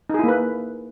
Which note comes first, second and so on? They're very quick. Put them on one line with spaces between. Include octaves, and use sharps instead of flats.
D#4 G#4 E4 A#3 B4